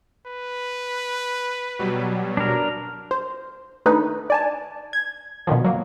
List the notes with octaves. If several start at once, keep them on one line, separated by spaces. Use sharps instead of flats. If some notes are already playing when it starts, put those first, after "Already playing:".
B4
B2 F#3 G3
D4 A#4
C5
D#3 A3 D4 D#4 B4
D5 G#5 A5
G#6
B2 D3 D#3 F3
F#3 A#3